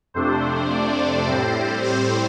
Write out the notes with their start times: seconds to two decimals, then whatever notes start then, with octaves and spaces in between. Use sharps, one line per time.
0.14 F2 C3 A3 D4 C5
0.70 D5
0.99 C5
1.26 A2 G3 C4
1.83 C5